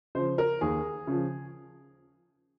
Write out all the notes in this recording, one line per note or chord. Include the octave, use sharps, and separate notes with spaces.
C#3 F3 C5
A#4
D#2 G#4
C#3 F3